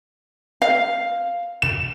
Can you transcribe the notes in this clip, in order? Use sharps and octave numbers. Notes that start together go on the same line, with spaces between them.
F5
E7